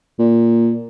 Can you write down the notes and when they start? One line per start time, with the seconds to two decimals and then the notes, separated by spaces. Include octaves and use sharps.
0.19 A#2